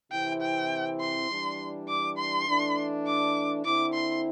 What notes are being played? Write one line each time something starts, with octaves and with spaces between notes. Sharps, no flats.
C3 E3 C4 E4 G5
G5
C6
E3 G3 D4
D6
C6
E3 A3 D4
D6
D3 C4 E4 D6
C6